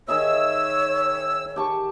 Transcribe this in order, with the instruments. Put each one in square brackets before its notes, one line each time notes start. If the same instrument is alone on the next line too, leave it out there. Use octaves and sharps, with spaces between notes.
[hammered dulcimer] D#3 G#4 E5 [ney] C#5 [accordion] E6
[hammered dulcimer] G4 A5 C#6